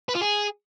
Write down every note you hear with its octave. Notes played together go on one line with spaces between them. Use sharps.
B4
F4
G#4